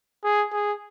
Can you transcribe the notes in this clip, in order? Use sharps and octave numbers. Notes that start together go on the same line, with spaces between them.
G#4
G#4